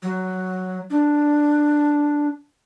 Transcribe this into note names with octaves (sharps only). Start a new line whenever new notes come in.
F#3
D4